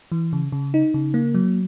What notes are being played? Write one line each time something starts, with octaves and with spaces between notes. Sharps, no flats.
E3
C#3
C#3
D#4
C#3
A#3
F#3